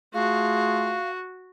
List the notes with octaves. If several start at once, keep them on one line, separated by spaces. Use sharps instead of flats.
A3 F4 F#4 G#4 F5